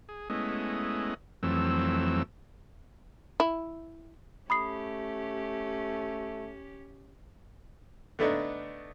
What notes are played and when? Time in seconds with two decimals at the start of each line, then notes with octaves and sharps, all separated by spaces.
0.09 G#4
0.30 G#3 A3 B3 C#4 E4 D#5
1.43 F2 E3 F#3 A3 C4 E6
3.40 E4
4.50 A3 C#4 G4 B5 D#6 C7
8.19 D3 A3 B3 D4 D#4